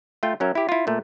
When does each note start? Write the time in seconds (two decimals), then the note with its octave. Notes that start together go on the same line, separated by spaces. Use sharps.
0.23 A3 F4 G5
0.40 F#3 C#4 A#4 E5
0.55 E4 G4
0.69 E4 F4
0.87 A#2 A3